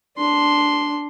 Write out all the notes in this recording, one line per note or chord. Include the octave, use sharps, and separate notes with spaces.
D4 C6